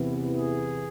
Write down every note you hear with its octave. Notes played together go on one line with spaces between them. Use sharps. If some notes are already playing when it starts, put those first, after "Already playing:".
Already playing: E2 C3 E3 B3 E4
G#4